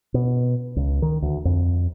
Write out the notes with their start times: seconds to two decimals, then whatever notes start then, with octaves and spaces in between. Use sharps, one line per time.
0.14 B2
0.76 C#2
1.02 D#3
1.22 D2
1.45 F2